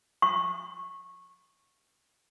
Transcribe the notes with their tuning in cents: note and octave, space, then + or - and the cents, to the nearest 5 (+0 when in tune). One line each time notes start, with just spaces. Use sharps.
C#6 -15